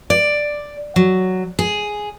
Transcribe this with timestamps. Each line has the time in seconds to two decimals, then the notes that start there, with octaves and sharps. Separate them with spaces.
0.10 D5
0.96 F#3
1.59 G#4